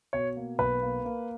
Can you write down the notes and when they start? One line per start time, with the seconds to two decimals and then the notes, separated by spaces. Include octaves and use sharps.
0.13 B2 C#5
0.37 A#3
0.58 B1 B4
0.82 A#3
1.05 A#3